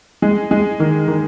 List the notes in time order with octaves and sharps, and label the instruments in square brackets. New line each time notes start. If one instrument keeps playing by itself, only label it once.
[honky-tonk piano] G#3
G#3
D#3
D#3